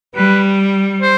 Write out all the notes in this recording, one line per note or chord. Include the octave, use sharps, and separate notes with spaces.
G3 B4
C5